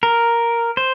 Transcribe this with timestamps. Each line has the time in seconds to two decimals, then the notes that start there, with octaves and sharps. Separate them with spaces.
0.03 A#4
0.77 C5